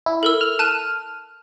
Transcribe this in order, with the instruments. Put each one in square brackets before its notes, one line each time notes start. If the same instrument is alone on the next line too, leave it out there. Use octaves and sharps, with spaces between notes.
[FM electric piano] E4
[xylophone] A4 A#4 E6
[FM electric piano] F6
[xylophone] A5 F#6 D#7